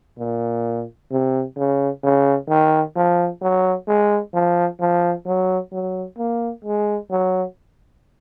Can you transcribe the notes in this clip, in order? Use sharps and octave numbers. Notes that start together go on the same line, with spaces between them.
A#2
C3
C#3
C#3
D#3
F3
F#3
G#3
F3
F3
F#3
F#3
A#3
G#3
F#3